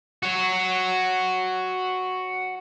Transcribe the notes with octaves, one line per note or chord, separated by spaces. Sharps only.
F#4 C#5